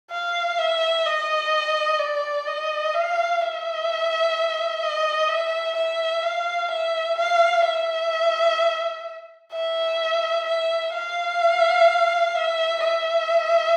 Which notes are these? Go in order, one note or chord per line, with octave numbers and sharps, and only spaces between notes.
F5
E5
D#5
D5
D#5
F5
E5
D#5
E5
E5
F5
E5
F5
E5
E5
E5
F5
E5
E5